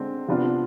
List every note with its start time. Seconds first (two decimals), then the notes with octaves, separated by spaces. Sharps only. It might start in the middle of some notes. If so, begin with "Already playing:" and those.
Already playing: D3 G#3 C4
0.28 C3 F3 B3 D4 F4